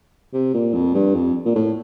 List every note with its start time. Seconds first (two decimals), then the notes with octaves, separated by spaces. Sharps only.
0.33 C3
0.54 A#2
0.74 F2
0.95 G2
1.15 F2
1.45 A#2
1.55 A2